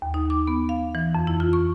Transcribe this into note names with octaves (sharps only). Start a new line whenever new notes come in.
D#2
D#4
D6
B3
F5
E3
F2
E4
F4
C#6